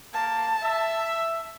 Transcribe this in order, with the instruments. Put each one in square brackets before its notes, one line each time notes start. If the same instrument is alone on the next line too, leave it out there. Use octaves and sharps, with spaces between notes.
[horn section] A#3 [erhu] A5
[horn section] E5